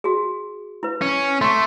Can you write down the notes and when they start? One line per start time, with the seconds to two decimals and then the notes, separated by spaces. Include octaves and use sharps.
0.04 F#4 G#4
0.83 E4 B4
1.02 C#4
1.41 A3 C6 C#6